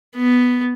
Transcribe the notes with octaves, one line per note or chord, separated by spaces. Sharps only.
B3